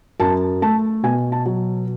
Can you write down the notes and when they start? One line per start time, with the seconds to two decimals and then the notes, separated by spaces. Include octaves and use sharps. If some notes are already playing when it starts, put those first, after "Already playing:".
0.20 F#2 A5
0.62 A3 A5
1.03 B2 G#5
1.32 A5
1.46 F#3